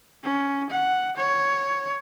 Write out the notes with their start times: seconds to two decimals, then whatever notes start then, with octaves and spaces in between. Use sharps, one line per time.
0.23 C#4
0.70 F#5
1.17 C#5